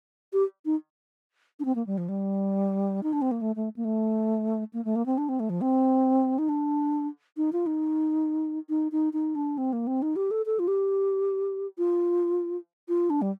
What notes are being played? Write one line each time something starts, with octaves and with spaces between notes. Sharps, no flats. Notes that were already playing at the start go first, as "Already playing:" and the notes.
G4
D#4
D4
C4
A#3
G3
F3
G3
D#4
D4
C4
A#3
A3
A3
A#3
A3
A#3
A3
A#3
C4
D4
C4
A3
F3
C4
D#4
D4
D#4
F4
D#4
D#4
D#4
D#4
D4
C4
A#3
C4
D#4
G4
A4
A4
F4
G4
F4
F4
D4
G3